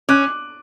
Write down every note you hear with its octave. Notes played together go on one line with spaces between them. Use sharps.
C#4 D6 F#6